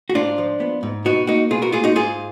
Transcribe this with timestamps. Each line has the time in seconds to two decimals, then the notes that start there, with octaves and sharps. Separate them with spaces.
0.10 F#4
0.15 G#2 D4 F4
0.38 F3
0.60 B3
0.83 G#2
1.05 B2 D#4 F#4
1.27 A#3 D#4 F#4
1.50 B2 F4 G#4
1.62 F#4 A#4
1.72 A#3 F4 G#4
1.84 D#4 F#4
1.95 G#2 F4 G#4